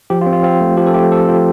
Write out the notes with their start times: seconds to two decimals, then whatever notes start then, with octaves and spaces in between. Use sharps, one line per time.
0.10 F3 G4
0.21 F4
0.26 C4
0.33 F4
0.43 C4 F4
0.61 A3
0.77 F3 G4
0.87 A4
0.94 A3 G4
1.12 C4 A4
1.28 F4